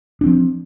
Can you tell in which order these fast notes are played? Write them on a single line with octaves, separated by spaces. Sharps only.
D4 C4 F3